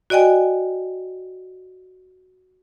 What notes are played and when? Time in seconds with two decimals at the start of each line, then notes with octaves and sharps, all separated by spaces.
0.10 F#4 D5 D#5 G5 G#5